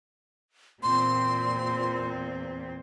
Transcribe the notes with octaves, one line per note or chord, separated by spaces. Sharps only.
E2 A#2 C4 C6